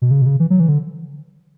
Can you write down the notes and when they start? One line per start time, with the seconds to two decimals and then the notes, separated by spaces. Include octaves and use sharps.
0.02 B2
0.11 C#3
0.22 B2
0.26 C#3
0.40 E3
0.50 F#3
0.60 E3
0.68 D3